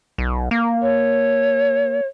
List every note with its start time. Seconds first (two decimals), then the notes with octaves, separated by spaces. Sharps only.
0.18 B1
0.51 A#3
0.82 C#5